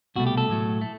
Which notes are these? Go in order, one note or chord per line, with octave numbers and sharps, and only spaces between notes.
C2 B2 A3 F#4
G4
A4
A2 F#3 A3
A3